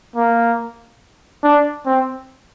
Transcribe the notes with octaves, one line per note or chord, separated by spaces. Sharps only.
A#3
D4
C4